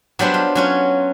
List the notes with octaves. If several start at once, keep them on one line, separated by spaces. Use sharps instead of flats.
F#3 G3 B3 D4 C5
F4
F#3 C#4 F4